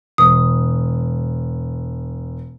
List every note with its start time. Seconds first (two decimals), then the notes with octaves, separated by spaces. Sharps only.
0.18 E1 D#6